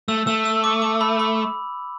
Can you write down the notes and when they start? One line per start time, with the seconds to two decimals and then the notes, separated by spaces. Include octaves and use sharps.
0.08 A3 E6
0.27 A3 E6
0.45 E6
0.64 D6
0.82 D6
1.01 B5
1.19 B5